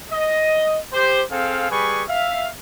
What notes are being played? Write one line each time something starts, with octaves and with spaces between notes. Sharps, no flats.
D#5
G4 C5
C4 G#4 A4 F5
G3 G#4 B4 G#5 C#6
E5 F5